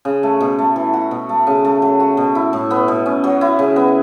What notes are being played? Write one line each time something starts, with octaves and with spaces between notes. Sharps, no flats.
C#3
A3
B2
A3
E3
F#4
B2
A3
C#3
A3
F#3
F#4
B2
E4
A2
B3
B2
C#4
F#3
E4
C#3
B3